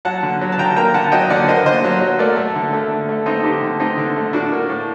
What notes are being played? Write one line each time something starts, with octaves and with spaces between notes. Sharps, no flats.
F#3 F#5 A5
D3
F#3
A5
D3 G5 A#5
A#3 G5 A#5
D3 F#5 A5
F#3 D#5 G5
D3 D5 F#5
A#3 C5 D#5
D3 C5 D#5
F#3
F#3
A3 A#4 D5
A3
D3
A3
D3
A3
A3 C4 D#4
D3 D#4 G4
D3
A3 C4 D#4
D3
A3
A2 D4 F#4
A#3
A2